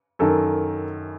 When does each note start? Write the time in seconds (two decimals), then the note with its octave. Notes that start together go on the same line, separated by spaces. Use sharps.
0.19 F#2 D#3 A4